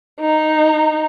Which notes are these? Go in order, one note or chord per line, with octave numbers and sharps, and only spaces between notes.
D#4